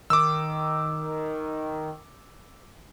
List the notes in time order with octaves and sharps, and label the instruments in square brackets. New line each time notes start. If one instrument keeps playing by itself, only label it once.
[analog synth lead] D#3 [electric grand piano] D6 E6